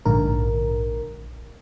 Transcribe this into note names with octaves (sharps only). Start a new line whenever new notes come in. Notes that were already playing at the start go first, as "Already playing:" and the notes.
A#1 G#2 D3 A#4